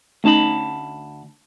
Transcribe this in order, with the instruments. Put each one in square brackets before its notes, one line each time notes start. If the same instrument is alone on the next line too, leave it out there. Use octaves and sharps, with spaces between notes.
[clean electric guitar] D2 A5 B5 [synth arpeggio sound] A3 C#4 D#4